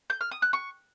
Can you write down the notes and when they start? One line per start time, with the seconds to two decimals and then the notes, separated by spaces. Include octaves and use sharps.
0.10 G6
0.21 F6
0.31 D#6
0.42 F#6
0.53 C#6